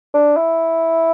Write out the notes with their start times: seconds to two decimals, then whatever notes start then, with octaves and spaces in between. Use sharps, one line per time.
0.14 D4
0.37 E4